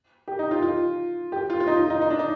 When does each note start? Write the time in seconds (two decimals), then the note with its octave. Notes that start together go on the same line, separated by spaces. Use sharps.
0.28 G4
0.39 D#4
0.51 F4
0.62 F4
1.32 G4
1.50 F4
1.60 F4
1.67 D#4
1.79 F4
1.90 D#4
2.02 D#4
2.10 D4
2.19 D#4